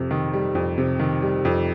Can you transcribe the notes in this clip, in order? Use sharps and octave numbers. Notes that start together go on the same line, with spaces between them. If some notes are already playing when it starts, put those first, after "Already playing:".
Already playing: F2 C3
D#3
G3
F2
C3
D#3
G3
F2